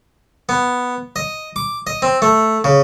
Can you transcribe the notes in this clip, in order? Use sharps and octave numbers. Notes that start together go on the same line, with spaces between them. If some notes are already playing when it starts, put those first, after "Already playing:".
B3
D#5
D6
D#5
C4
A3
C#3